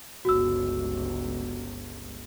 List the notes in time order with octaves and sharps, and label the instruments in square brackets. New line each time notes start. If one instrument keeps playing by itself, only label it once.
[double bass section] G1 C#2 [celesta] F#4 E6